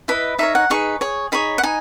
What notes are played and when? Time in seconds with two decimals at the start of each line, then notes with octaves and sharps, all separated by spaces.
0.08 E4 B4 D#5 B5
0.39 D#4 A#4 C#5 E5
0.55 F#5
0.70 D#4 G#4 B4 C#6
1.01 G#4 C#5
1.32 D#4 G#4 C#5 B5
1.58 F#5
1.63 D#4 G#5